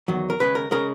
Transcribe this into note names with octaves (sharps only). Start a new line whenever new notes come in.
E2 D#3 F#3
A#4
D#2 C#3 G#3 B4
A#4
C#3 G#3 A#4